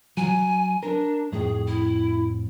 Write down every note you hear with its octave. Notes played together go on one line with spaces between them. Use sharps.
F#3 G#5
D4 A#4
F2 A2 G#4
E4